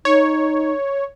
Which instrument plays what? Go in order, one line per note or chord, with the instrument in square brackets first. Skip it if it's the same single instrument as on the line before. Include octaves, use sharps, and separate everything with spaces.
[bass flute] D#4 [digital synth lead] C#5